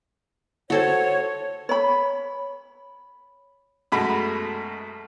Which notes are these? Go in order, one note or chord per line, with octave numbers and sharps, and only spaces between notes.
F#4 A4 C5 C#5
C#5 B5
F#2 B2 G#3 A3 B5